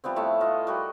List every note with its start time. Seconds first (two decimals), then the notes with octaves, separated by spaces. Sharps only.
0.04 F3 G3 B3 C4
0.16 A2 C#5 E5 A5
0.41 F4 D#5
0.67 G3 F#4 A#4